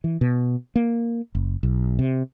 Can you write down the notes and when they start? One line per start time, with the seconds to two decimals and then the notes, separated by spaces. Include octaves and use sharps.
0.04 E3
0.21 B2
0.76 A#3
1.35 F#1
1.63 B1
1.99 C3